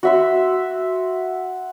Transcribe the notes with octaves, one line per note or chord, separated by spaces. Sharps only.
F#4 E5 C6